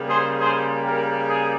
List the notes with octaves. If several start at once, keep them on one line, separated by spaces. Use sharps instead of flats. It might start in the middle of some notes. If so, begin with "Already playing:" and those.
Already playing: C#3 G3 A#3
G#4 C5
G#4 C5
G4 A#4
G#4